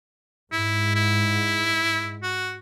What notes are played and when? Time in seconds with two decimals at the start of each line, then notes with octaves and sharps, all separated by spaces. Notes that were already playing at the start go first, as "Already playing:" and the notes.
0.52 G#2 E4
0.95 E4
2.23 F#4